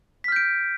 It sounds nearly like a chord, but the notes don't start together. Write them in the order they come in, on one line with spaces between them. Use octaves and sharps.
B6 F6 G6 D7